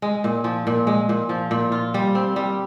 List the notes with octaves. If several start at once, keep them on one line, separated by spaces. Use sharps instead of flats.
G#3
A#2
F3
A#2
G#3
A#2
F3
A#2
F4
G3
C4
G3